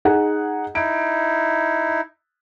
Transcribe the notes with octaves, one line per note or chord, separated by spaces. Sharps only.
D#4 G#4 F#5
D#4 E4 D7